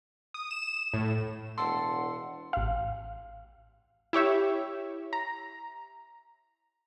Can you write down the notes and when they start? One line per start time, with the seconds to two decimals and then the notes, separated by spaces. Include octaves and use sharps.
0.34 D#6
0.51 E7
0.94 A2
1.58 E1 A4 F#5 C6
2.53 A1 F5
4.13 E4 G4 C#5 E5
5.13 A#5